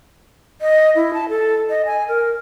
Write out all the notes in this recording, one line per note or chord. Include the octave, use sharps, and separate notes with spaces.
D#5
E4
A5
A4
D#5
G#5
A#4